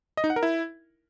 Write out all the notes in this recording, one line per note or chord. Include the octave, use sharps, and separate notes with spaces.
D#5
D#4
F#5
A#4
E4